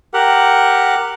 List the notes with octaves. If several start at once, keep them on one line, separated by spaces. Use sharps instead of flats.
G4 A#4 F#5